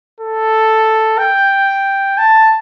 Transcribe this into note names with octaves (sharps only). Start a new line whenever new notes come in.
A4
G5
A5